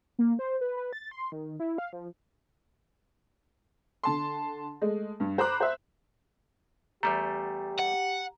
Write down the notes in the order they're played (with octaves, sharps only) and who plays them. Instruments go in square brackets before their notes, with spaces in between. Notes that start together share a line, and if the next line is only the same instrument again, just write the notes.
[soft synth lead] A#3
C5
B4
B4
A6
C6
D#3
E4
F5
F3
[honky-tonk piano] D3 A5 C6
G#3 A3
G2
C5 A#5 B5 D6 F#6
C5 E5
[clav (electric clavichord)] E2 G3 A3 [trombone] G4 [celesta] A#5
[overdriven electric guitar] F#5